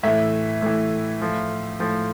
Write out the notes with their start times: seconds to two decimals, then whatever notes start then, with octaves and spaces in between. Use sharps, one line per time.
0.03 A2 E3 E5
0.62 A2 E3
1.21 A2 F3
1.80 A2 F3